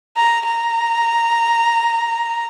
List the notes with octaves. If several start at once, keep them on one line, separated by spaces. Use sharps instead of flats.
A#5
A#5